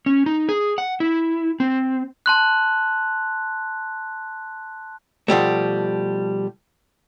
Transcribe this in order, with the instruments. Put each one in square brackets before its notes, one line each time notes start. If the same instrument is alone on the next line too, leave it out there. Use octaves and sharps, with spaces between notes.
[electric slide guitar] C#4
D#4
G#4
F#5
E4
C4
[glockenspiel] A5 C6 F#6
[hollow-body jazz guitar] B2 F3 G3 A3